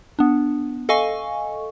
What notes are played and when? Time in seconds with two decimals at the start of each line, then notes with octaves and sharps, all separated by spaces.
0.19 B3 D4
0.89 A4 D#5 F5 G#5 C#6